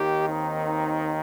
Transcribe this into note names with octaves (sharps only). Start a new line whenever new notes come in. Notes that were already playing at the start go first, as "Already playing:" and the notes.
Already playing: D#2 D#3 G4
C4 D#4